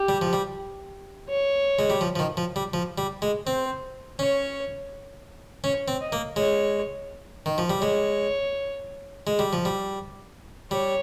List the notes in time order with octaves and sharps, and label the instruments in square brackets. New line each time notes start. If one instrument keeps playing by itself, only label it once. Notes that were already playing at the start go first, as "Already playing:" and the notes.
Already playing: [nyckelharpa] G4
[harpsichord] G3
F3
G3
[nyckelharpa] C#5
[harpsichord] G#3
G3
F3
F3
D#3
F3
G3
F3
G3
G#3
[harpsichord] C4 [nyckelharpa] C5
[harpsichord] C#4 [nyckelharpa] C#5
[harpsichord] C#4 [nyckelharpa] C#5
[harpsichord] C4
[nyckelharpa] D#5
[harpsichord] A#3
[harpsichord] G#3 [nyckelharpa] C#5
[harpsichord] D#3
F3
G3
[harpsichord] G#3 [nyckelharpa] C#5
[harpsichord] G#3
G3
F3
G3
[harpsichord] G3 [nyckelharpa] C#5